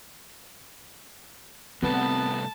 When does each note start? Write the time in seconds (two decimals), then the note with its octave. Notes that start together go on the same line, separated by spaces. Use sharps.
1.83 C3 G3 A3 B3 C4 A5